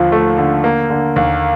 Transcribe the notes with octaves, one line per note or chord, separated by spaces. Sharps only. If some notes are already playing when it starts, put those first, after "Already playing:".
Already playing: D#2 D3 F3
A3
D3
A#3
D3
D#2